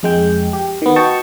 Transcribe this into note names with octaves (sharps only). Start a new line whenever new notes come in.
F2 G#3 G5
G4
D#3 B3
F#4 D#5 G5 A5 C#6